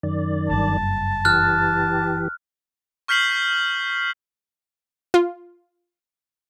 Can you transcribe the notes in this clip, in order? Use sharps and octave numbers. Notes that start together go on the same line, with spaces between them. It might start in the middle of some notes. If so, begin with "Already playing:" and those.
F#2 D#3 D5
F#1 G2 A5
E3 G4 F6 F#6
C#6 F6 G6 B6 C7 F#7
F4